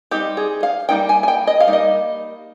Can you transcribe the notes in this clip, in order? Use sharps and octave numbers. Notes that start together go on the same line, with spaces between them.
G3 C4 D#4 G4
G#4
F5
G3 A#3 D#4 G5
G#5
G#5
G5
D#5
F5
G3 A#3 D#4
D#5